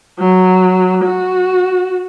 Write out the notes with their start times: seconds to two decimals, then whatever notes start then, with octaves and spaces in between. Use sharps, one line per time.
0.19 F#3
1.05 F#4